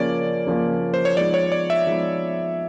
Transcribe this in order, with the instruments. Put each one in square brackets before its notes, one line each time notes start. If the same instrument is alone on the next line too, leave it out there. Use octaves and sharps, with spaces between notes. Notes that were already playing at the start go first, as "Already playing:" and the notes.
Already playing: [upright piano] C#3 F3 A#3 C#4 [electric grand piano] D5
[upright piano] C#3 F3 A#3 C#4
[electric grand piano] C5
C#5
[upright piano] F3 G#3 B3 D#4 [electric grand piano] D5
[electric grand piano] C#5
D5
E5
[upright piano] F3 G#3 B3 D#4